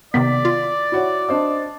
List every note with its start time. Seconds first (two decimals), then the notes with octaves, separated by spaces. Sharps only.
0.14 C3 D#3 B3 D5 B6
0.45 F4
0.92 E4 F#4 C#5
1.29 D4 C5 D#5